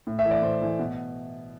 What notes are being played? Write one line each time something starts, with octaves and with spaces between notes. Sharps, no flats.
A2
E5
E3 A3
D5
A2 C5
E3 A3
B2